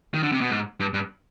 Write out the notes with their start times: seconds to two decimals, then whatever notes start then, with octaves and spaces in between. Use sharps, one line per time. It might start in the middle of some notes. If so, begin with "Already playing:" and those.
0.14 D#3
0.23 D3
0.32 C3
0.41 B2
0.50 G#2
0.80 G2
0.94 G2